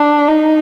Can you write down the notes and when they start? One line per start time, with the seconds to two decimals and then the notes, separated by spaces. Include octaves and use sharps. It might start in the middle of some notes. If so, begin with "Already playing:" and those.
Already playing: D4
0.29 D#4